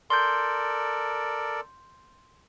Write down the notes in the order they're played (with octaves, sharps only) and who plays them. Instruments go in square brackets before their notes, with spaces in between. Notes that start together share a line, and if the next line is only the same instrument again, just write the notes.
[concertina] A4 A#4 D5 [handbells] C6 G6